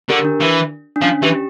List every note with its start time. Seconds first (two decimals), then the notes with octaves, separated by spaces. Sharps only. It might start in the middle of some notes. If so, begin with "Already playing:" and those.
0.09 D3 G4 A#4
0.25 D4
0.41 E3
0.96 D4
1.02 F3 C#4
1.23 E3 G4